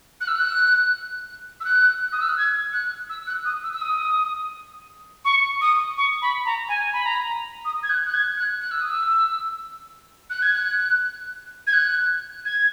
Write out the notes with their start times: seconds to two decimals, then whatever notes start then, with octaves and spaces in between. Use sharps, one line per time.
0.21 F#6
0.28 E6
0.36 F#6
1.60 E6
1.65 F#6
2.12 D#6
2.20 E6
2.29 F#6
2.37 G#6
2.73 F#6
3.09 E6
3.27 F#6
3.45 D#6
3.63 E6
3.73 E6
3.81 D#6
5.25 C#6
5.61 D#6
5.97 C#6
6.22 B5
6.45 A#5
6.69 G#5
6.93 B5
7.06 A#5
7.65 D#6
7.83 G#6
7.90 F#6
8.06 F#6
8.14 G#6
8.38 F#6
8.61 F#6
8.71 E6
8.81 D#6
8.90 E6
10.30 F#6
10.42 G#6
10.54 F#6
11.67 G#6
11.73 F#6
12.45 G#6